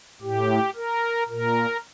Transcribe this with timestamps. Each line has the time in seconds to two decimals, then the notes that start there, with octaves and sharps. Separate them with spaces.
0.22 A2 G4
0.76 A#4
1.29 A#2 A#4